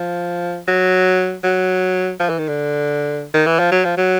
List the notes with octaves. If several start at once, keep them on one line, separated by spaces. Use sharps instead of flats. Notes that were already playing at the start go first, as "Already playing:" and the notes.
Already playing: F3
F#3
F#3
F3
E3
D#3
D3
D#3
E3
F3
F#3
F3
F#3